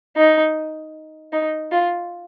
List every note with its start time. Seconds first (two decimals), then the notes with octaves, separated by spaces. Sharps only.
0.16 D#4
1.32 D#4
1.71 F4